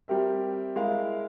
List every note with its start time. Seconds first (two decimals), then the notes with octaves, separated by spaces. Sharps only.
0.08 G3 C4 G4 A#4 E5
0.76 G#3 E4 A#4 F5